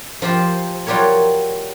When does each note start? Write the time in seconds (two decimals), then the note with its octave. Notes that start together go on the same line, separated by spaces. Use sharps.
0.22 F3 F4 G4 C5
0.87 F#3 G3 F4 G4 A#4 C#5